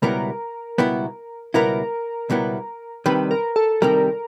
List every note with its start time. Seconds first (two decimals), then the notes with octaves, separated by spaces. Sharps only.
0.02 C#2 B2 G3 B3 E4 A#4
0.78 C#2 B2 G3 B3 E4
1.54 C#2 B2 G3 B3 E4 A#4
2.30 C#2 B2 G3 B3 E4
3.06 C2 C3 D#3 G3 B4
3.31 A#4
3.56 A4
3.82 C2 C3 D#3 G3 A#4